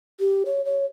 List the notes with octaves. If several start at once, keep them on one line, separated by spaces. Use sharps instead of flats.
G4
C#5
C#5